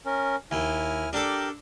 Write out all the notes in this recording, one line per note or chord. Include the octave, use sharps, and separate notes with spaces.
C#4 A#4
D#2 E4 G#5 F6
D4 G4 A4 A#4